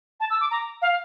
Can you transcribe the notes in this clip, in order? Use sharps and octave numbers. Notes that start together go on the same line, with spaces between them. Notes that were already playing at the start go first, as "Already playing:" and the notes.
A5
E6
D6
A#5
F5